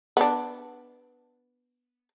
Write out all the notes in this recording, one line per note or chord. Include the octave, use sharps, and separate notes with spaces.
B3 D4